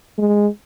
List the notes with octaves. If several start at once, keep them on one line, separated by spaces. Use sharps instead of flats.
G#3